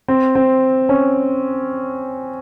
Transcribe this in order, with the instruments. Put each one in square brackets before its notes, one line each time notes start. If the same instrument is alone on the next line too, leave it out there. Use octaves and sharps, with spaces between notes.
[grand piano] C4
C4
C#4